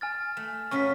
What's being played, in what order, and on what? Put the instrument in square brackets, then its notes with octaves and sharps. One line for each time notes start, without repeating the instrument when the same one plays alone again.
[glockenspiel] G#5 F6 A6
[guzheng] A3
[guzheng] F#2 C#3 C#4 [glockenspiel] C#6 B6